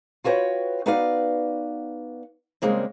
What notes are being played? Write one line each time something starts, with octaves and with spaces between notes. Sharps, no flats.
F4 F#4 B4 C#5 G5
B3 D#4 F#4 B4 D5 F5
C#3 G3 G#3 A#3 C4